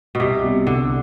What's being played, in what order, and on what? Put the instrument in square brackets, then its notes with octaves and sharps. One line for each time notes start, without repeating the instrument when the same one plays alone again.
[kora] B2
[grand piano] C2 [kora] C3
[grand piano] B2 G3 C4
[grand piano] C2 [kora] D3